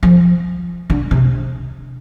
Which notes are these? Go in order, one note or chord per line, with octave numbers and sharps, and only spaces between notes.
F3
D3
C3